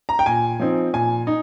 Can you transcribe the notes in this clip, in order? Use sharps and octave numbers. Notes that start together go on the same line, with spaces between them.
A#5
G5
A#2 G#5
F3 C4 D#4
A#2 G#5
D#4